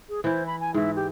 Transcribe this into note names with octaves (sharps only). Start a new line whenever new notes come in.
G#4
E3 E4 C5
B5
G#5
G#2 E3 E4
G4